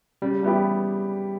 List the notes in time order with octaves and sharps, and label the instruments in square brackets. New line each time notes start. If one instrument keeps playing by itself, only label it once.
[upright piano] C#3 [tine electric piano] G3
[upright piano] G3 B3 E4 G4